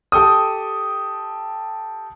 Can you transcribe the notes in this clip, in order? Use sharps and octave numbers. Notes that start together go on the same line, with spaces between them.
G4 A4 G5 D#6